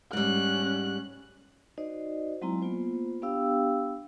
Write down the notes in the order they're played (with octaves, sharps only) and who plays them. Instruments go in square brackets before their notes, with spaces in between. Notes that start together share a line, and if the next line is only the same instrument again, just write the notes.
[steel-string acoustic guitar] G#2 G3 [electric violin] C#4 F#6
[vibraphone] D#4 F#4 C5 D5 D#5
F#3 G#3 C4 E4 F4 A#5
A#3 B3 F4 C5
B3 D4 G4 F5 G5 E6